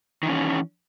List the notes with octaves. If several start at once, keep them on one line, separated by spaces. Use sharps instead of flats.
D#3 E3 C#4